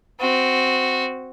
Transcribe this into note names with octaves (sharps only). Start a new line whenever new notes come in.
C4 F#4